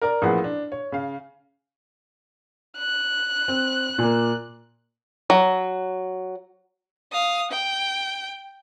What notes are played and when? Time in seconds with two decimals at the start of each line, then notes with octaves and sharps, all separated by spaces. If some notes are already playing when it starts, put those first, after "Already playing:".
0.02 A#4 D5 A#5
0.22 A1 A#2 F3 G#4 B4 F#5
0.44 D4
0.72 C#5
0.92 C#3 F5
2.78 F#6
3.48 C4
3.98 A#2 A#3
5.30 F#3
7.12 F5 D#6
7.51 G5